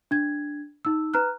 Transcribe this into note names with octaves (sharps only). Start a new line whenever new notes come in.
D4 G#6
D#4 E6
B4 A#5 F6 F#6